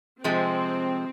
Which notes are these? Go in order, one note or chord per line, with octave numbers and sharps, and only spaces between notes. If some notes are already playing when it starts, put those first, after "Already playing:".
C3 F3 G#3 C4